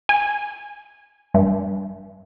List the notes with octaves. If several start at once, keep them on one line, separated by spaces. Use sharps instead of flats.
G#5
G2